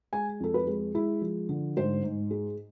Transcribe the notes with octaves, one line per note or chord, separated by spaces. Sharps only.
G#3 G#5
F2 A4
B4
G#3
G#3 E4
F3
D3
G#2 C5
G#2
G#3